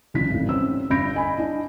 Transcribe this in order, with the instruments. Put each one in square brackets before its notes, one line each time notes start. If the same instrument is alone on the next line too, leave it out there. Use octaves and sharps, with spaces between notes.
[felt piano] C#2 D3 E3 F#3 D#4 B6
G#1 F2 A2
G3 C4 C#4 B4 E6
G1 G2 B5 G6 A#6 D7
D#5 G#5 B5
D4 E4 D#5